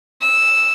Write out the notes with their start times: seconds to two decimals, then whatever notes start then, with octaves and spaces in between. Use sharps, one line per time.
0.21 E6